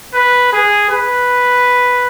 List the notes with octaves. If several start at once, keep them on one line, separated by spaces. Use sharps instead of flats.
B4
G#4
B4